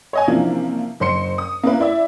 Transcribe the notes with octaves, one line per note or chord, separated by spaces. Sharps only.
C#5 D#5 G#5
C3 E3 F3 A#3 C#4 D4
F#1 C5 C6 C#7
D#6
A#3 C#4 E4 A#4 B4
E4 D5 E5